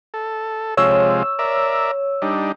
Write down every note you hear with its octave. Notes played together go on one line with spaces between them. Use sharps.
A4
C3 F3 G#3 C#5 E6
A#4 D5 E5
G3 D4 D#4